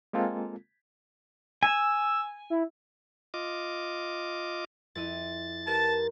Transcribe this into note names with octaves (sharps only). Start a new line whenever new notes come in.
G#3 A#3 C4 F4 A4
G#5 E6
E4
F4 D#5 D6
F2 E4 A6 D#7
G4 A#4 B4 A5